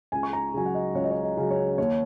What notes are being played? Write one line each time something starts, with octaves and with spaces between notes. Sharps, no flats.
C#2 G#5
C#6
A#5
C#3 F#3 G#5
F#5
D#5
C#2 C#5
D#5
C#5
D#5
C#3 F#3
C#5
D#2 C#5